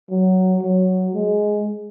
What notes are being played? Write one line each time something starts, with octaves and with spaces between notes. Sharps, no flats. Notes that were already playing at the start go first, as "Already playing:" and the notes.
F#3
F#3
G#3